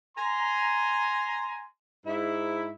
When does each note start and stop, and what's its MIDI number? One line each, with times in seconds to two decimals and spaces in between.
0.17 1.64 80
0.17 1.64 82
0.17 1.64 84
2.07 2.72 44
2.07 2.72 64